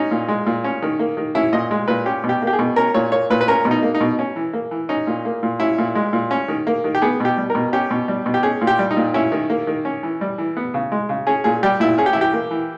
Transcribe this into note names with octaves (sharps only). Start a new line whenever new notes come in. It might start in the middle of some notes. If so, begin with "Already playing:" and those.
Already playing: C#4 D#4
A#2
G#3
A#2
C#4
D#3
A#3
D#3
C#4 E4
A#2 D#5
G#3
A#2 B4
C#4 G4
B2
G4
A#3
G4
G#4
B2
C#4 A#4
A#2 C#5
A#3 C#5
A#2 B4
B4
C#4 A#4
B2
D#4
A#3
D#4
B2
C#4
E3
A#3
E3
C#4 D#4
A#2
A#3
A#2
C#4 E4
A#2
G#3
A#2
C#4
D#3
A#3
D#3
G4
B3 G#4
B2 G4
G3
A#4
B2
C#4 G4
B2
G3
B2
G4
C#4 G#4
A#2
G4
G3
D#4
A#2
C#4 E4
D#3
A#3
D#3
C#4
E3
G3
E3
B3
C#3
G#3
C#3
C#4 G#4
A#2 G#4
G3 G4
A#2 E4
C#4 G#4
G4
E4
E3
G4
A#3
E3